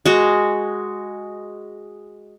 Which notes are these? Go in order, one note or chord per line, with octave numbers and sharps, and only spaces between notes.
G#3 F#4